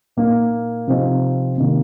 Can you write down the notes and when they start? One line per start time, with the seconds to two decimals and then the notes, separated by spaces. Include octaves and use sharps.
0.17 A#2 A#3 D#4
0.88 C3 F3 C4 D#4
1.58 C3 D#3 A#3